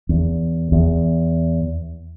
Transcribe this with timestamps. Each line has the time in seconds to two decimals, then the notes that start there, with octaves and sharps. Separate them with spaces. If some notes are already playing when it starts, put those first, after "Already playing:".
0.09 E2
0.72 E2